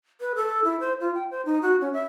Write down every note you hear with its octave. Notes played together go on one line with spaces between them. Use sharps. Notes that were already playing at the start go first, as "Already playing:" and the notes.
B4
A4
E4
C5
F4
G5
C5
D#4
F#4
C#4
E5